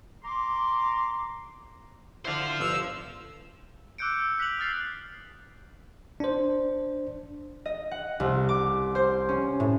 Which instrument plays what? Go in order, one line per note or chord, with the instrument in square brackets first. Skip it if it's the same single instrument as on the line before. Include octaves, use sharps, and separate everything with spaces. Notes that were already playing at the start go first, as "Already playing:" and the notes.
[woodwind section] A#5 C6 D6
[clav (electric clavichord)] D3 D4 E4 [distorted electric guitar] C5 F5
[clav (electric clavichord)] G1 [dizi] E6
[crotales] D6 E6 F#6 G6 C#7 D7
D7
E6
F#6 B6 C#7 F7 F#7
D#6 F6 A6 C7
[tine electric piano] D4 C5
[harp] D#5
F#5
C2
D6
C5
C#4
A2